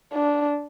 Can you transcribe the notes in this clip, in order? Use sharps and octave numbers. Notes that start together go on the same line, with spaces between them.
D4